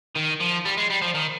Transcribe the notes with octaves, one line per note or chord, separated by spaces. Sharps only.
D#3
F3
G3
G#3
G3
F3
D#3